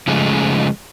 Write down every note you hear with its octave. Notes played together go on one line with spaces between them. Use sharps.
C#3 F3 G#3 A3